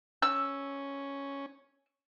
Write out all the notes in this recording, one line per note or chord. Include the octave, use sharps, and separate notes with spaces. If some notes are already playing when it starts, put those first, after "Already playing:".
C#4 E6